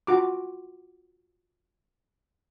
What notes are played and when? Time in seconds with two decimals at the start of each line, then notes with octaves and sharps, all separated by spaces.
0.07 F4 F#4 D6